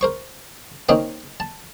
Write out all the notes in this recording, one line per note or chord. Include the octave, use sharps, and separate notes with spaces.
A#4 C5 C#6
D#3 A#3 C4 C#4 D#5 G5
A5